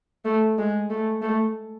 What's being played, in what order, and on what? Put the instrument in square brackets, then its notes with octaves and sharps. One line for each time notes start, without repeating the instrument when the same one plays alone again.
[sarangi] A3
G#3
A3
A3